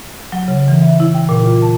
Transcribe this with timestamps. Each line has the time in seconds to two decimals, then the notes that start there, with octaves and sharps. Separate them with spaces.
0.32 F#3
0.48 C#3
0.68 E3
0.81 E5
1.00 E4
1.14 G5
1.29 A#2
1.42 F4
1.62 A5